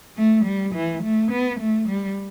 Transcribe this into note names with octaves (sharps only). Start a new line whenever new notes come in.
A3
G3
E3
A3
B3
A3
G3